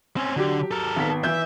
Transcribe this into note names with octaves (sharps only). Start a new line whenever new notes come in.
C4 C#4
D3 F#3 G4
A4 A#4
G#1 B3 B6
E3 E5 G6